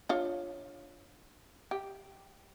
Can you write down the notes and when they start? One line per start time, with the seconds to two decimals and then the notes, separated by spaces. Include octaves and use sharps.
0.09 D4 F4 C#5
1.71 G4